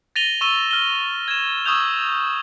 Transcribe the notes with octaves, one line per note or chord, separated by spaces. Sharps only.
A6 A#6 D#7 F7 G7
C#6 E6 D#7 G7
F6 G7
G#6 E7
C#6 D#6 E6 G6 F7